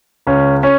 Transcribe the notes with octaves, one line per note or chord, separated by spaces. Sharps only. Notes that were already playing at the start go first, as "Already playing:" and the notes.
C#2 C#4
C#4